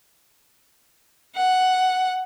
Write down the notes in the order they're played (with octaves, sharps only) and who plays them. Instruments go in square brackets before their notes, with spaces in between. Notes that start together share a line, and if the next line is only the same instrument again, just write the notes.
[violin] F#5